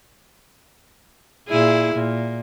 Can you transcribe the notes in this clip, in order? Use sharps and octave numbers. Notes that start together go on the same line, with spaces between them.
A#2 E4 G#4
A#2